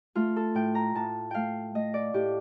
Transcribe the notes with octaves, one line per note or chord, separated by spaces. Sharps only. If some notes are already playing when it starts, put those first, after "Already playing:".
A3 F4
A4
A2 G5
A#5
A2 A5
A3 F5 G5
A3 D#5
D5
A2 G4